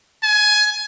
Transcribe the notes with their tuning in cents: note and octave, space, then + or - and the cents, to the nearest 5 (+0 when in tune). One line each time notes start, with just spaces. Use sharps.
G#5 +20